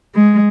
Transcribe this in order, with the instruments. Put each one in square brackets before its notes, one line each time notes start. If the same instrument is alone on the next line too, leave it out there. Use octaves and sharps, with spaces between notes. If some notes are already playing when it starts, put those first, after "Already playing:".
[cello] G#3